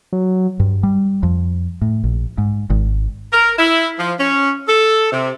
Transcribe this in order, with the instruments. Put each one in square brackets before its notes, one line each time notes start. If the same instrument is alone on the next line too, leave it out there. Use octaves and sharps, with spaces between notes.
[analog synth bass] F#3
[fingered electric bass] G2
G3
F2
A2
A#1
G#2
G#1
[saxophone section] A#4
E4
F3
C#4
A4
C3